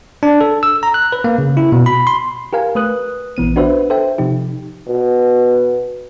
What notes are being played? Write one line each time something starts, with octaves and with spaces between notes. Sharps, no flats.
D4
A4
E6
A#5
F#6
B4
A#3
C#3
E4
B2
B5
C6
G4 A#4 F5 G#5
A3 B4 D#6 F#6
A#1 E3 B3 D#7
D4 F#4 B4 C5 E5
A4 C5 E5 G5
C3 F3 D#4 G4
B2